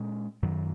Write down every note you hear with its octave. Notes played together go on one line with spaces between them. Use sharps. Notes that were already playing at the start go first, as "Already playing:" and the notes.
Already playing: A#2 G#3 C#4
F#2 D#3 F#3